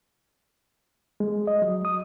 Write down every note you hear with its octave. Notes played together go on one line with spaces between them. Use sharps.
G#3
D#5
F#3
D#6